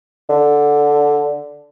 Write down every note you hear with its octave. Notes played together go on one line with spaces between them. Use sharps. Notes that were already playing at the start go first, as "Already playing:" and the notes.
D3